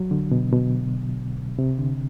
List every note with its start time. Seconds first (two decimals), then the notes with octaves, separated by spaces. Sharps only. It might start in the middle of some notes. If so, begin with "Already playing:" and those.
Already playing: F#3
0.11 D3
0.31 B2
0.53 B2
1.59 C3
1.79 D3